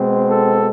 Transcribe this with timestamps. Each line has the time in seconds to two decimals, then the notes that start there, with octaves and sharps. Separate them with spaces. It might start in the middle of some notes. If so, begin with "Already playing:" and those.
Already playing: B2 G#3 C4
0.29 A4